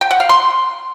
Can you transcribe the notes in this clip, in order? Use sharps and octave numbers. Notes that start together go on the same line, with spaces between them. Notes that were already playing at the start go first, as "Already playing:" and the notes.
G5
F#5
F5
C6